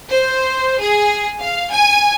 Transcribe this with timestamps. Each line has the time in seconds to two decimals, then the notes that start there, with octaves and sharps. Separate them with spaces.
0.11 C5
0.82 G#4
1.40 F5
1.72 G#5